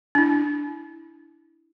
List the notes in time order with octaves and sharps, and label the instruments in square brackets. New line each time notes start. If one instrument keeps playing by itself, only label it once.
[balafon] D4 E4